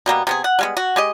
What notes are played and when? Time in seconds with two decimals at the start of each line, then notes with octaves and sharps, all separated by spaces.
0.06 B2 G3 A#3 B3
0.27 C3 B3 G#4
0.44 F#5
0.59 G3 G#3 B3
0.77 F#4
0.96 G#3 G4 D#5